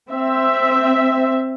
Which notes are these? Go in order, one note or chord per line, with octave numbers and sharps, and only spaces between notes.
C4 E5